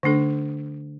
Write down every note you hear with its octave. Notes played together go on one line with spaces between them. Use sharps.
D3 A3 D4 A4